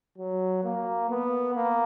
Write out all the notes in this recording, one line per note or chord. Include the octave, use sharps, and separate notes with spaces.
F#3
A#3
B3
A#3